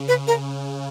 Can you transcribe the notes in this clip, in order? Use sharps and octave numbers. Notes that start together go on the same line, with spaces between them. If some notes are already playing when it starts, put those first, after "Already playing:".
Already playing: C#3
B4
A#4